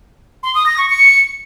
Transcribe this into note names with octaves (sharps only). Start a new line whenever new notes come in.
C6
D#6
A#6
C#6
C#7